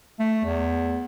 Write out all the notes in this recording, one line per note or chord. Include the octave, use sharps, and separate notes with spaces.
A3
E2